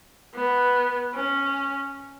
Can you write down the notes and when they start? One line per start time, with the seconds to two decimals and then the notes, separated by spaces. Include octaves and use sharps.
0.35 B3
1.14 C#4